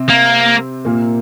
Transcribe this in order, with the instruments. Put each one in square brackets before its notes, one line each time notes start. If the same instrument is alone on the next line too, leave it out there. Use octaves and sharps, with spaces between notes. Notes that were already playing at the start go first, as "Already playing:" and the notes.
Already playing: [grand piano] C3 C4
[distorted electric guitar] A#3
[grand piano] A#2 A#3